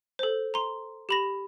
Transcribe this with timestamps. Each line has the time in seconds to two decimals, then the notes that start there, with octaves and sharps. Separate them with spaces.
0.19 A4 C5
0.54 A#5 C6
1.09 G4 B5 A#6